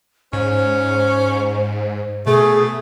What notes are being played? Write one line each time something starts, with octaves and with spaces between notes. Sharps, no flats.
G#2 C#4 C5
B2 A3 G#4